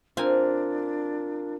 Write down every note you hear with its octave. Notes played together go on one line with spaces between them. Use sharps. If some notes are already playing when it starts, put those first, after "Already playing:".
C4 D4 F4 A#4 F5 G#5